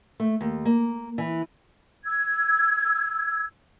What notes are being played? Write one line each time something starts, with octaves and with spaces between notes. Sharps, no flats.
A3
D#2
A#3
E3
E6 G#6